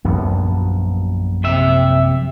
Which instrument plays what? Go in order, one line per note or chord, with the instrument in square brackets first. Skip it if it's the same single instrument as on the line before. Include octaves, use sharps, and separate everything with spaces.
[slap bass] A#1 F#2 B3
[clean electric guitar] C3 E5